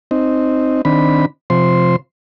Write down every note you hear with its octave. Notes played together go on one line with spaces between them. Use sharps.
C4 D#4
D#3 C4 D4 B5
C3 F3 C5 C6